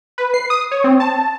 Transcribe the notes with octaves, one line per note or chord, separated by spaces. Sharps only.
B4
C7
D#6
C#5
C4
A5